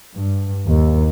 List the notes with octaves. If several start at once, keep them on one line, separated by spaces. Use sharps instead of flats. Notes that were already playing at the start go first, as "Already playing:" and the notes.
G2
D#2